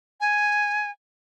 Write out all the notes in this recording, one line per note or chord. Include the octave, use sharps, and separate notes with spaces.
G#5